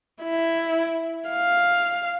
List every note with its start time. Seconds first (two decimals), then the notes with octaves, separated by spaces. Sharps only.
0.23 E4
1.30 F5